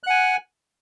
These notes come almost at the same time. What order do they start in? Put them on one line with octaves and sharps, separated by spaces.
F#6 F#5 G#5